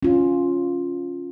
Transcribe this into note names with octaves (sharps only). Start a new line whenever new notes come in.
C#4 F4